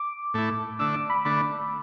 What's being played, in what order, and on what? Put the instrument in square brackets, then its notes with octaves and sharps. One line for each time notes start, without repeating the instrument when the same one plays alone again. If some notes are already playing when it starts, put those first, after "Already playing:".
Already playing: [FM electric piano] D6
[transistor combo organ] A2 A3 E4
[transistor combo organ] D3 A3 D4 [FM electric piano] E6
[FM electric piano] D6
B5
[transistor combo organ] D3 A3 D4 [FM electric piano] B5